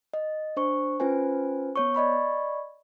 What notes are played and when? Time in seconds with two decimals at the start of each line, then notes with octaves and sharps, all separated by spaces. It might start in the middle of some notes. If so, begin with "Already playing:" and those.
0.14 D#5
0.57 D4 C5 C#6
1.00 C#4 F4 B4 C5 G#5
1.75 B3 C#5 C#6
1.94 D5 D#5 B5 C#6